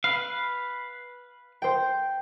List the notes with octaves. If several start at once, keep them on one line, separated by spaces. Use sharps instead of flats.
B4 F5
C5 G5